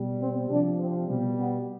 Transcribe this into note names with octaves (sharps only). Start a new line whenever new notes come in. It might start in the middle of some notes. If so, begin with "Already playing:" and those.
Already playing: B2 G3
C4
C3 F3 D4
C4
B2 G3
B3